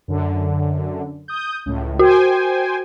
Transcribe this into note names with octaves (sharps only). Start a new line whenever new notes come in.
F#2 D3
D#6 G6
C#2 A2
F#4 C5 G5 G#5